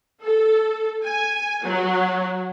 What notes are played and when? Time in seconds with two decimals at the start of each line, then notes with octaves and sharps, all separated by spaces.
0.22 A4
1.04 G#5
1.63 F#3